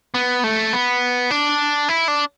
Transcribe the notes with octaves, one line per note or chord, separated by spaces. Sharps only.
B3
A3
B3
D4
E4
D4